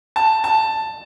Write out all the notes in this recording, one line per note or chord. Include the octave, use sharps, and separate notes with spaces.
A5
A5